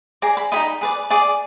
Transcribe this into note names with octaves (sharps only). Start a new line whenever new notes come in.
G#4 D5 A#5
B5
D#4 G#4 D#5 B5
G#4 B4 D5
G#4 D5 D6